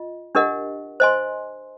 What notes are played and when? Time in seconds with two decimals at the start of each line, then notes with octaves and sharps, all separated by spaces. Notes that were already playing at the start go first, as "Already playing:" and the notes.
Already playing: F4 D#5
0.35 D4 G4 A#4 D#5 F#5
1.00 C5 D#5 G#5 C6